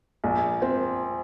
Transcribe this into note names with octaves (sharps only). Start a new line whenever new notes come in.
A#1
C4